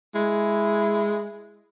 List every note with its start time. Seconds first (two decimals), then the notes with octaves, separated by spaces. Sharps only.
0.15 G#3 E4